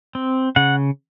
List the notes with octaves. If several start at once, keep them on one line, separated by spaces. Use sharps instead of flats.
C4
C#3 F#5